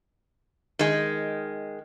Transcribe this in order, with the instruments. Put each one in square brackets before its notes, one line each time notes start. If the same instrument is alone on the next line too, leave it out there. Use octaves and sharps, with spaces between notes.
[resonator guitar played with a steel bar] D#3 G#3